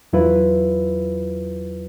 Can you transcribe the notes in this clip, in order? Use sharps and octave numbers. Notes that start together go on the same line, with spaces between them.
E2 F#3 E4 F4 B4